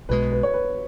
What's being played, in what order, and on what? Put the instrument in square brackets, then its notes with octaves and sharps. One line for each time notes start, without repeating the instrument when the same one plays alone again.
[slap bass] B1 B2 G#3 [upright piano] B4
[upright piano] B4
C#5
B4